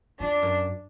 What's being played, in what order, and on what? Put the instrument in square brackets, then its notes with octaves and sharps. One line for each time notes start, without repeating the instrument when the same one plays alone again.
[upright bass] F2 [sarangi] D4
[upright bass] F#2